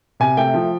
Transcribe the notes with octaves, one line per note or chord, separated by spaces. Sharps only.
C3 G#5
A3 G5
F3